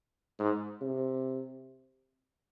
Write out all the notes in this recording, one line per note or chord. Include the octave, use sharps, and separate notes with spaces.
G#2
C3